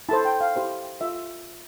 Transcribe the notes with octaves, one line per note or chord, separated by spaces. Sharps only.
E4 A4 C5 A5
G5
F5
E4 G4 C5
F4 E5